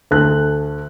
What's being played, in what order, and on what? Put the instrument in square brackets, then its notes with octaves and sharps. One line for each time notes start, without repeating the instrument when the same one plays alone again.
[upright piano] D2 A4 F#6